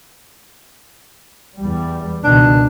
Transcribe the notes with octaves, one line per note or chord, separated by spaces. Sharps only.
E2 G3
C#2 B2 D#3 D4